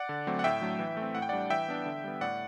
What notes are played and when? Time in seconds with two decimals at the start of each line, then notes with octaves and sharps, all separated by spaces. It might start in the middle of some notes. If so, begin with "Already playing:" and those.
Already playing: D5 F#5
0.09 D3
0.27 F#3 A3 C4
0.39 F#5
0.44 A2 E5 G5
0.62 F#3 A3 D4
0.79 E3
0.97 A3
1.02 C4
1.15 A2 F#5
1.22 G5
1.29 G3 D4 D5 F#5
1.50 E3 E5 G5
1.68 B3 D4
1.86 D3
2.04 G3 B3
2.21 A2 D5 F#5